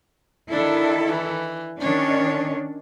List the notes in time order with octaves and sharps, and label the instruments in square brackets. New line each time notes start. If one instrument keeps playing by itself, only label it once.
[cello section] D#3 E4 A4 [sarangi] D4
[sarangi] E3
[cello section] D#3 C#4 D4 [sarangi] C#5